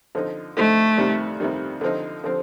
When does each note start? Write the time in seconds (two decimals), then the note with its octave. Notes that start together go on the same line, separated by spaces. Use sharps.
0.15 D3 F3 C4 D#4
0.57 D3 F3 A3 C4 D#4
0.97 F2 C3 D#3 G3
1.40 F2 C3 D#3 G3
1.81 D3 F3 C4 D#4
2.24 D3 F3 C4